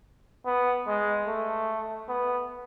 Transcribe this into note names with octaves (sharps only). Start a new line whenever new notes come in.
B3
G#3
A3
B3